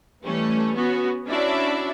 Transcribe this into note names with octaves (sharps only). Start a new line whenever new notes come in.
E3 G3 A3 C#4
B3 C#4 F#4
C#4 D4 E4 F#4 D5 E5